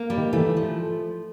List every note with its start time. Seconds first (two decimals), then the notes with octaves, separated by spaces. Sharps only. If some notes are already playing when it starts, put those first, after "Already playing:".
Already playing: A#3
0.10 G3
0.18 D#3
0.33 E3 A3
0.57 F3